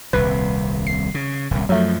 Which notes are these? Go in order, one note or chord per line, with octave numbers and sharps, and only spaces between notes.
D#1 C2 C3 B4
C7
C#3
D#1 C2
F#2 F3 F#3 A3